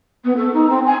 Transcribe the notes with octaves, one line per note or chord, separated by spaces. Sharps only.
B3
A4
D#4
C4
G#5